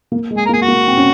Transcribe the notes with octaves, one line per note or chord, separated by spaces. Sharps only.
A#3
G#3
G#4
A#4
A#3
G#4
F#4
A#3
C4
C#4